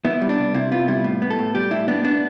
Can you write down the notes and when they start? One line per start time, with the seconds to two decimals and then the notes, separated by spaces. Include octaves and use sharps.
0.05 B3 E4
0.21 G3
0.29 D4
0.38 C2
0.54 C3 E4
0.71 B3 F4
0.88 G3 E4
1.04 A2
1.22 B3
1.30 A4
1.39 A2
1.55 G3 G4
1.71 A2 E4
1.88 B3 D4
2.05 B3 D4